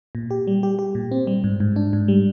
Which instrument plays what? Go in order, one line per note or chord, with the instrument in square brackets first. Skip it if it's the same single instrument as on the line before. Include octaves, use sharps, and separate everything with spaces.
[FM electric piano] A#2
G4
G3
G4
G4
A#2
C4
G3
G#2
G#2
D4
G#2
G3